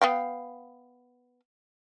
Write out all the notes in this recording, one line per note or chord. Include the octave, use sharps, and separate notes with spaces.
B3 F5 G5